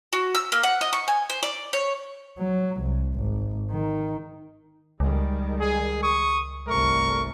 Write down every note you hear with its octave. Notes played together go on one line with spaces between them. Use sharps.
F#4
E6
A#3
F#5
D#5
C#6
G#5
C5
D5
C#5
F#3
C2
G#1
D#3
C#2 D#3 G3 G#3
G#4
C#6 D#6
G1 C2 A3 A#4 C#6